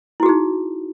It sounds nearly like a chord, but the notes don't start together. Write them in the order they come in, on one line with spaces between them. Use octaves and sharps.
E4 F#4 G#4 D#4